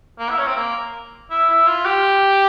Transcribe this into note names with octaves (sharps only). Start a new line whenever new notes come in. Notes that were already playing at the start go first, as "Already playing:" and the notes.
A#3
E4
C#4
C4
A#3
E4
E4
F4
G4